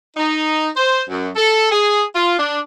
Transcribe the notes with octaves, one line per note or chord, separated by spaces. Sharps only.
D#4
C5
F#2
A4
G#4
F4
D4